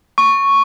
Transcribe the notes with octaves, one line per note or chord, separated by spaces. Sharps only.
C#6